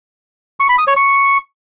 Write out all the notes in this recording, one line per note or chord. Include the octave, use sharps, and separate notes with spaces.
C#6
B5
D#6
C#5
C#6